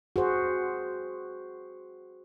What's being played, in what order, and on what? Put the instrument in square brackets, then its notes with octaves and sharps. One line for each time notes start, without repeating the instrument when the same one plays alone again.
[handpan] F#4 G#4 C5